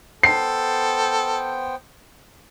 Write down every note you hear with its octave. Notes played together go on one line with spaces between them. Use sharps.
B3 A4 C5 G5 C7